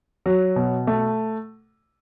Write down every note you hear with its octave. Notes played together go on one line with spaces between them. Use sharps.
F#3
B2
A3